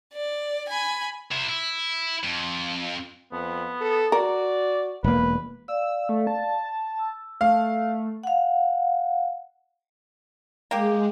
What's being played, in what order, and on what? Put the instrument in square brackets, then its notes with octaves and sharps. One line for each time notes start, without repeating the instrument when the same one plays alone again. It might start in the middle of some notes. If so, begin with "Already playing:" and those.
[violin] D5
G#5 B5
[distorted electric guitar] C3 E4
E4
F2
[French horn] F2 [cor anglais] B3
[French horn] A4
[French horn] F#4 [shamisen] A#4 [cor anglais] D5
[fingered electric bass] E1 A#3 [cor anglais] B4
[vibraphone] D5 F5 [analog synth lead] E6
[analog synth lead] A3
A5
[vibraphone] E6
[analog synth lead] A3 [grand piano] F5
[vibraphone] F5 F#5
[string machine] G#3 [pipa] A#3 G4